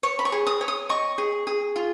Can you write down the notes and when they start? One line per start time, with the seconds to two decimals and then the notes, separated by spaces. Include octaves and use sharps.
0.03 C#5 C#6
0.19 B5
0.25 C#6
0.32 G#4
0.47 D#6
0.61 C#5
0.68 D#6
0.89 D#5 C#6
1.18 G#4
1.47 G#4
1.76 F4